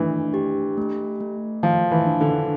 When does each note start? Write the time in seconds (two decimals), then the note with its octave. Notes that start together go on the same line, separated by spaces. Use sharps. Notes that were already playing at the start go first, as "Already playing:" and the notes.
Already playing: E3 A3 D4
0.34 G4
0.77 A3
1.20 A3
1.63 F3 A3
1.91 E3
2.06 D4
2.21 D3